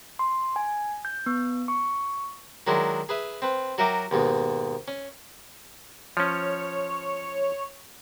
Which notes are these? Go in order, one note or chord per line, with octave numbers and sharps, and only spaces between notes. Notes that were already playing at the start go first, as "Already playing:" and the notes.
C6
G#5
G6
B3
C#6
D#3 F#3 G#3 D4 E4
G#4 B4 E5
C4 B4
F#3 F#4 A#4 E5 G5 D6
D#2 G#2 B2
C#4
F3 C#4 C#5